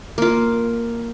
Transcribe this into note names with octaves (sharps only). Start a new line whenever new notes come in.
A#3 F4